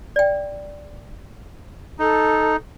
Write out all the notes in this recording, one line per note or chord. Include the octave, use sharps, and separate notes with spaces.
D5 G5
D#4 A4